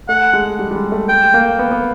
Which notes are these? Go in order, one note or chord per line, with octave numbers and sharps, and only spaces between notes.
A3 F#5
G#3
G3
G3
G#3
A3
A3 G5
A#3
B3
B3